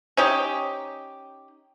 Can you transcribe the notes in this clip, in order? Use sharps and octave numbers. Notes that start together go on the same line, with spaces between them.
C#4 D#4 G4